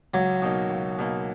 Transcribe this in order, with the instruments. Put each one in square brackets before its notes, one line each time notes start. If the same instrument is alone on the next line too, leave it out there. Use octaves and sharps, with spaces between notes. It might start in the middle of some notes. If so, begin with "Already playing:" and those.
[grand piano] C#2 [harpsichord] F#3
[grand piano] B2 A#3 D#4
C#2
B2 A#3 D#4